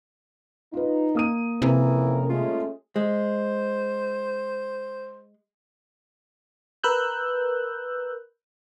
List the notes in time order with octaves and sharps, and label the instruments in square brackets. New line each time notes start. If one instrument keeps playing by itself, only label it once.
[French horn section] D#4 [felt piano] F4 B4
[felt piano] A#3 D#6 D#7
[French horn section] F2 C#4 A#4 [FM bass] C3 [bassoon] E3
[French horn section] G#3 A3 C#4 [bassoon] F4
[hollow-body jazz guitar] G#3 [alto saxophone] C5
[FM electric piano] A#4 B4 E6 F#6 G6